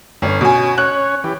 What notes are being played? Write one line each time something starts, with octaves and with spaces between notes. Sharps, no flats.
G1 C#4
B2 G#5
C#4 C#5 F#6
E3 G4